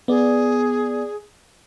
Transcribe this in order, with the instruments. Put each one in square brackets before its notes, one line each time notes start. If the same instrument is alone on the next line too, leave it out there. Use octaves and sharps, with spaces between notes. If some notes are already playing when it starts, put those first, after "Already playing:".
[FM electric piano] B3 D5 [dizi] G#4